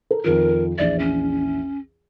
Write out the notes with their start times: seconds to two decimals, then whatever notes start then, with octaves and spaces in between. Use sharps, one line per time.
0.11 A4 A#4
0.24 F2 D#3 F3 A#4
0.78 A#1 E2 D5 E5
0.99 C#4